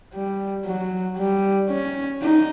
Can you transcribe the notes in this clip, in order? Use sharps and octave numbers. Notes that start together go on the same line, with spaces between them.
G3
F#3
G3
C#4
D#4